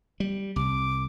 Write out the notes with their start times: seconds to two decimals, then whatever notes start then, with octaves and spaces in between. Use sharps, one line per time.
0.20 G3
0.56 C2 D6